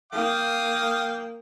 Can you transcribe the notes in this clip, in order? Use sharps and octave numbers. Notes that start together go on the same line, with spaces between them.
A#3 F5 G5 D#6